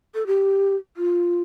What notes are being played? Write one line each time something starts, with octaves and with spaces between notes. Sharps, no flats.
A4
G4
F4